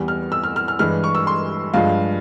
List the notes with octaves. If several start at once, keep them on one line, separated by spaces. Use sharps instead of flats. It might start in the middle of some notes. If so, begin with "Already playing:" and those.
Already playing: E2 E3 G3
F6
E6
F6
F6
F6
G2 E3 G#3 F6
C#6
E6
C6
G2 F3 G#3 F5